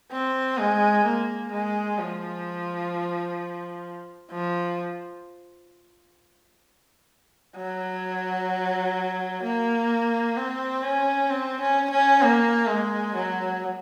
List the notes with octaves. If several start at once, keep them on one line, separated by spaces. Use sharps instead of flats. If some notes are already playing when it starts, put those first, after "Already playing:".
C4
G#3
A#3
G#3
F3
F3
F#3
A#3
C4
C#4
C4
C#4
C#4
A#3
G#3
F#3